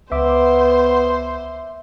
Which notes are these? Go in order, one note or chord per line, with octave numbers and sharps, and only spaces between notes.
C#2 B3 C5 E5 D6